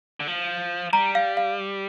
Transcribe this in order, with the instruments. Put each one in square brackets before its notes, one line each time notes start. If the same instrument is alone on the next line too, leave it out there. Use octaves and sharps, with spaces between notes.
[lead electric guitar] D3
F3
[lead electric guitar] G3 [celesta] A#5
[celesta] F5
F5